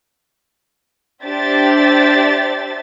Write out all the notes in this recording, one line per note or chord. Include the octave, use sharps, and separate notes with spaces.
D4 G4 C5 D5 E5 A6